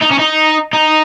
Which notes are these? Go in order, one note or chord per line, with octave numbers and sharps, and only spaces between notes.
D#4
C#4
D#4
D#4